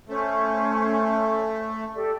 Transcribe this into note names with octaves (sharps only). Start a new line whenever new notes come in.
A3 C#4 C5
G4 A4 D5